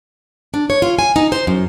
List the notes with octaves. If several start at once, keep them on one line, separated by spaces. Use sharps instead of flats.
D4
C#5
F4
G#5
D#4
C5
F#2